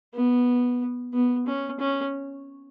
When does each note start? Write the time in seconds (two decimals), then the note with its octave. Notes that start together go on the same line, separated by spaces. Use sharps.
0.14 B3
1.13 B3
1.47 C#4
1.80 C#4